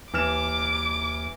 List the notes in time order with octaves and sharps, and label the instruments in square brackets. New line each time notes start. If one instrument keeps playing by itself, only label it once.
[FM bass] D#2 [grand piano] E3 F6 E7 [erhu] D6